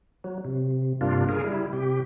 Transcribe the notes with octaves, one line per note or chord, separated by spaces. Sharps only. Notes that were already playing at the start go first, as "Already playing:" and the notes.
F#3
C3
G2 C3 A#3 D4 F4
C#3 G#4 A#4
G3 E4
C3 G4